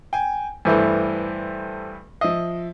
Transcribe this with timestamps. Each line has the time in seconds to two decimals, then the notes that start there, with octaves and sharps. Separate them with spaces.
0.13 G5 G#5
0.65 G2 E3 A3 G4 A4 C5
2.21 F3 D#5 E5